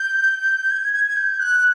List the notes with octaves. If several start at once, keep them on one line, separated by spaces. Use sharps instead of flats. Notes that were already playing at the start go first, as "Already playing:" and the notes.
Already playing: G6
G#6
G#6
G#6
G6
F#6